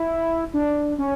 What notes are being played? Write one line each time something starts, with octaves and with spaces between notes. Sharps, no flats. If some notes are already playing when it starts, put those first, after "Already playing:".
Already playing: E4
D4
C#4